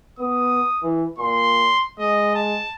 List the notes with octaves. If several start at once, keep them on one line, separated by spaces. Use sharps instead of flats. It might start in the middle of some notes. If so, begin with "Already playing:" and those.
B3 D#6
E3
A#2 C6
G#3 D#5
A5